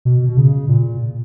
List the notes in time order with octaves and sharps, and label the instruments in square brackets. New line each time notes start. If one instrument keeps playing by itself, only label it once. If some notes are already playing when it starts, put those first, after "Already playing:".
[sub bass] B2
B2
C#3
A#2